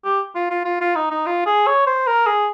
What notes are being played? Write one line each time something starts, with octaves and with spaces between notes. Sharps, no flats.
G4
F4
F4
F4
F4
D#4
D#4
F4
G#4
C#5
C5
A#4
G#4